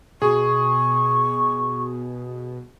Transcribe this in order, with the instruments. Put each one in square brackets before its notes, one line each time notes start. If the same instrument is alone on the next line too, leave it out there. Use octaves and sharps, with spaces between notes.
[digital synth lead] B2 [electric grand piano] G#4 [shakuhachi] C#6